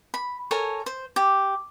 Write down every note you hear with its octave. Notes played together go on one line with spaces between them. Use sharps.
B5
A4 A#4 C#5 G#5
C5
G4